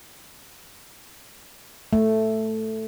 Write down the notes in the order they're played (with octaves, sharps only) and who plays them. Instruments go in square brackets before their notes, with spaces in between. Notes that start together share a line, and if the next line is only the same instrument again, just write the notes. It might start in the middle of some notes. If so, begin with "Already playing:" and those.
[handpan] A3